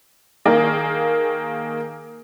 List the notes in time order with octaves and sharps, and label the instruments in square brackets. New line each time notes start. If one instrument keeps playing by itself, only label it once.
[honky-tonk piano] D#3 A#3 G#4